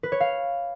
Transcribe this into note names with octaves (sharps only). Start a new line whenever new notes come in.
B4
C#5
F5